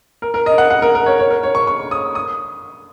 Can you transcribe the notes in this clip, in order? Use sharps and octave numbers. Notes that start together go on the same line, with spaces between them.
A#4
A#4
D#5
F#5
F#5
A#4
A#4
C#5
C#5
A#4
C#5
C#6
C#6
D#6
D#6